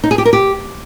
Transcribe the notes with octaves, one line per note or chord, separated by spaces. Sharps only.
D#4
G#4
G4
A#4
G4